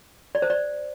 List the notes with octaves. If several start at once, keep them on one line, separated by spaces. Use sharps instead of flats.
D5
C5
D5